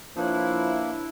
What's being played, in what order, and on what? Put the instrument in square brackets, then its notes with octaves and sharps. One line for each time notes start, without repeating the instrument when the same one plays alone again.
[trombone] F3 [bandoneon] A#3 [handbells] D4 B4 C#5 [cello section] E4